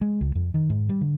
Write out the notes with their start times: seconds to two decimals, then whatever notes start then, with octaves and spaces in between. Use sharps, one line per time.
0.01 G#3
0.21 C#2
0.35 F2
0.54 D#3
0.70 G#2
0.89 G3
1.01 D3